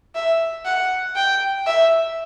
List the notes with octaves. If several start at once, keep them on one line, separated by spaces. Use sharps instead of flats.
E5
F#5
G5
E5